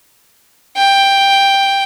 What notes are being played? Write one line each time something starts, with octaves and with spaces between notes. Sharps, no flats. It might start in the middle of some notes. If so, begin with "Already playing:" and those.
G5